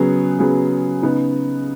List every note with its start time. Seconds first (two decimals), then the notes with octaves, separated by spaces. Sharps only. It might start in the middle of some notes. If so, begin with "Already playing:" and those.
Already playing: C#3 F#3 B3 G#4
0.39 C#3 F#3 B3 G#4
1.03 C#3 B3 D#4